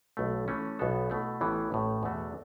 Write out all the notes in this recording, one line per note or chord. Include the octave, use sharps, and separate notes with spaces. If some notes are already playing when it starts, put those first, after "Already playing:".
B1 B2 A3
E3 A3 C#4
B1 B2 B3 F#4 A4
B2 A3 E4
A1 A2 E3 B3
A1 A2 A3
E2 B2 A3 F#4